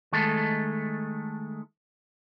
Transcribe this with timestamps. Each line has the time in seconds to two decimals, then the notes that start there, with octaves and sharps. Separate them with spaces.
0.12 D#3 G#3 A3 A4